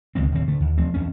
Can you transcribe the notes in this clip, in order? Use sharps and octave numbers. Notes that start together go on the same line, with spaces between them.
C#2 D#3 G#3 C4
D1 D#3 C4
D3 A3
D#2
F3 A3 C4
E2 C4 C#4